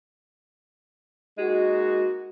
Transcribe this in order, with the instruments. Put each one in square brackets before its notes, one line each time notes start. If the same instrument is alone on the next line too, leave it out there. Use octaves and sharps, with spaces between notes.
[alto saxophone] G#3 [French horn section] A#3 D#4 F#4